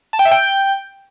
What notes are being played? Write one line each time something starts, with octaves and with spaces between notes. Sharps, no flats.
A5
G5
E5
G5